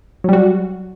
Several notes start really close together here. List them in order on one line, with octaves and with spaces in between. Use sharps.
F#3 G3 F#4